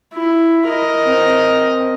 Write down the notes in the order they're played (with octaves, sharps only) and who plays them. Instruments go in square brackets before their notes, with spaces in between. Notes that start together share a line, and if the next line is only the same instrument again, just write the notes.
[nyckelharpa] E4
A#4 D#5
[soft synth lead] C4